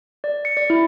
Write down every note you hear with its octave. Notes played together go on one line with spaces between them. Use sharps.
D5
C#7
D5
E4